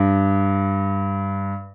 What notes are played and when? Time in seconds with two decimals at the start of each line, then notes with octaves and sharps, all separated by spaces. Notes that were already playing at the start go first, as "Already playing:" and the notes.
Already playing: G2